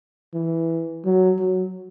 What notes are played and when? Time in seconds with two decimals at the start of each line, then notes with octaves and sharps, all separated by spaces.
0.34 E3
1.05 F#3
1.39 F#3